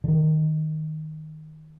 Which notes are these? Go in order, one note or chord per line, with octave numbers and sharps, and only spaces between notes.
D3
D#3